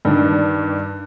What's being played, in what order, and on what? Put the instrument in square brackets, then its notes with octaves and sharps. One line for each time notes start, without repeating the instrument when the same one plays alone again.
[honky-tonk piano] G2 D#3 D4